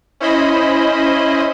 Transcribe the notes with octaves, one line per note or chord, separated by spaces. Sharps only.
C#4 E4 C5 D#5 B5